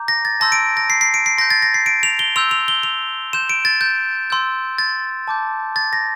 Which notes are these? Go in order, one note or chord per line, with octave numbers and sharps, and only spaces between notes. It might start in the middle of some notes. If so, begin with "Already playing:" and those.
Already playing: A#5 D6 G6
A#6
A6
A5 C6 E6 G6 A#6
D7
A#6
C7
C7
D7
C7
C6 G6 A#6
A6
A#6
C7
D7
F7
G7
C6 E6 G6 F7
F7
G7
F7
C6 G6 E7
D7
A6
G6
C6 E6 G6
A6
A5 D6 G6
A6
A#6